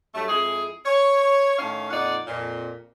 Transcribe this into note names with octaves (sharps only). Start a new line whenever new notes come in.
G2 F#3 A3
F2 G#3 E4 G#4
C#5
A2 D#3 C#4 F5
F2 A#2 D#4 D5 F#5
F2 A#2